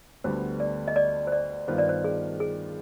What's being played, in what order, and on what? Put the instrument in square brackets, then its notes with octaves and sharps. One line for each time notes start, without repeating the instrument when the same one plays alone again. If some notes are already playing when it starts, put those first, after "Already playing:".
[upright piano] D2 D3 G3 B3 [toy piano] C5
[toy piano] D5
D#5
D5
C5
D5
[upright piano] G2 D#3 B3 F4 [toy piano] C5
[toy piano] D5
C5
G#4
G#4